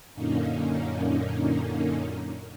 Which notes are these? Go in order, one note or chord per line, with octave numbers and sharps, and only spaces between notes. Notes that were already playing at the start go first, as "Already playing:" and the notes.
F#2 A#2 D3 A#3 C#4 D#4